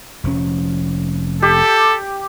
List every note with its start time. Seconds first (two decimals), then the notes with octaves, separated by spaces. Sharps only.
0.24 F1 F3 C#4
1.42 G4 A4